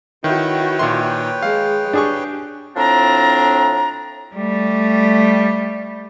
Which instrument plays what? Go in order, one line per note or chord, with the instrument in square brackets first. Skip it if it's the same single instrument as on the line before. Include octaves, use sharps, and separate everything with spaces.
[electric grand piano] D#3 [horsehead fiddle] E4 F#4 [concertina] B4 C#5 G5
[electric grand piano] A#2 D#3 C6
[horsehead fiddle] G#3 [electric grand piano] F5
[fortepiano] D4 G#4 C#6 [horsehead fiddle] G4
[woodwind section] A2 F3 C4 D4 A#5
[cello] G3 A3